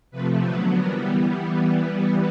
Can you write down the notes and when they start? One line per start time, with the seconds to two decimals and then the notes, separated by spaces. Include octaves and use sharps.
0.11 C3 F3 A3 B4
0.44 D3 F#3 B3 B4
0.77 E3 G3 B3 A#4